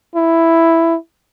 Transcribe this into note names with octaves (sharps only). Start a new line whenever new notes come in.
E4